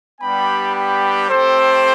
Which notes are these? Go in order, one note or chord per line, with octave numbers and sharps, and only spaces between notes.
G3 B3 D4 G4 G5 B5
G5 B5
A3 C4 G4 A4 C5